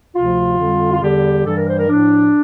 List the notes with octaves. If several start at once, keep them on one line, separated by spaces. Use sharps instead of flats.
D2 C3 F3 F4
F2 D3 G3
F4
E2 D3 G3 G4
G2 E3 G3 A4
A#4
C5
A#4
A2 F3 D4